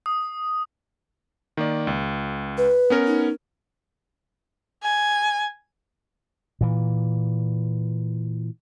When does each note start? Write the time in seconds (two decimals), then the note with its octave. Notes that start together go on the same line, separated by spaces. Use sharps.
0.06 D#6
1.57 D#3 A#3 D5
1.87 C#2
2.58 B4
2.90 B3 C#4 A#4
3.07 D#4
4.83 G#5
6.61 A#2 E3